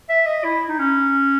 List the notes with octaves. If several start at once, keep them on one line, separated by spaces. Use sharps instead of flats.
E5
D#5
E4
D#4
C#4